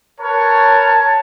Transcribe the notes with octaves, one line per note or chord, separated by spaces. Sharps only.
A#4 B4 C#5 A5